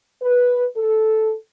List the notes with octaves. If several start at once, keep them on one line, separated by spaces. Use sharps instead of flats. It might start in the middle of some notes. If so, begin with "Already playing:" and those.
B4
A4